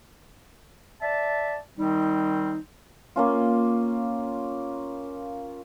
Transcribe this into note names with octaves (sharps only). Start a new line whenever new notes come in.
D5 E5 A5
D#3 G3 C4 D#4
A#3 C#4 F4